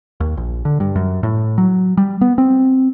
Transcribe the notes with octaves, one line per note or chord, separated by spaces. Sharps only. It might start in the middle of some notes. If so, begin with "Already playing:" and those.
D#2
A#1
D3
G2
F#2
A2
F#3
G3
B3
C4